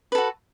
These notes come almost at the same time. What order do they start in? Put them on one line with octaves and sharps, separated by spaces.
B4 A4 F#4